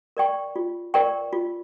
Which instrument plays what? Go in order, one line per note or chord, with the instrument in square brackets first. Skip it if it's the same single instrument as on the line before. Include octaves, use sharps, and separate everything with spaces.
[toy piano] A#4 D5 G5 C#6
F4
A#4 D5 G5 C#6
F4